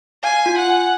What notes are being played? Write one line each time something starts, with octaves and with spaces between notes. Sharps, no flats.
F5 G#5
F4
F#5
G#5